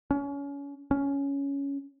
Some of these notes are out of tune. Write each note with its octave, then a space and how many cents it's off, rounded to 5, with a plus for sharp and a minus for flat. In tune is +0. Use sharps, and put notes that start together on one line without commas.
C#4 +30
C#4 +10